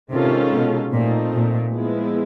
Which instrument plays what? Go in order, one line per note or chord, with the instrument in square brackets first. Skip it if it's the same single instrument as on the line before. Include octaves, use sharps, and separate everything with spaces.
[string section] C3 [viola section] D#3 G#3 C#4 F4 A4
[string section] B2
[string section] A#2 [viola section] F3 A3 C4 D#4
[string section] A#2
[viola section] F3 G#3 B3 E4